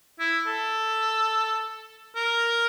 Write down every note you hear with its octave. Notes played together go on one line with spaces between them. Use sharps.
E4
A4
A#4